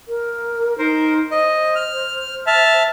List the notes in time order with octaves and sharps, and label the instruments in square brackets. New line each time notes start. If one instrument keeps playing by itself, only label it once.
[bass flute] A#4
[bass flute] D#4 [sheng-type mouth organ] A#4 C5
[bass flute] C5 [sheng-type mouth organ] D#5
[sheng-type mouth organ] F6
E5 A5 F6